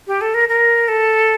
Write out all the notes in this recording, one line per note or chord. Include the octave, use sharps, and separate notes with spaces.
G4
A4
A#4
A#4
A4